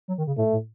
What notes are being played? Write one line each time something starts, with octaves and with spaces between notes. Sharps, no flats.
F#3
D#3
C#3
A2 A3
A2